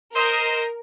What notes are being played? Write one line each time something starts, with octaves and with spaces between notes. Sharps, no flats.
A#4 C5 D#5